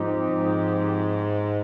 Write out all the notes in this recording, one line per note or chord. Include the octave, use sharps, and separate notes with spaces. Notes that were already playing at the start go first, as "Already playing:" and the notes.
Already playing: G#2 F3 C4 D#4 G4
G#2